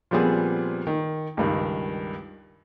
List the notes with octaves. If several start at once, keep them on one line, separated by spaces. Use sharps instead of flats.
A#2 F3 G3 B3 C4 G#4
D#3
C#2 G2 D#3